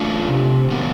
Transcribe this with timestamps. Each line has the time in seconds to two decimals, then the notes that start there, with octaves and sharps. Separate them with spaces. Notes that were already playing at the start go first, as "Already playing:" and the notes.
Already playing: A3 D4 F4
0.28 C3
0.70 D#3 F#3 B3 D4